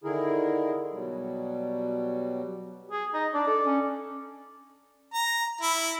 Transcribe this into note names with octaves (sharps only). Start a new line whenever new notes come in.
D3 D#3 E4 G#4 A#4
B2 F#3 G3
G#4
D#4 D#5
D4 D5
A4
C#4
A#5
E4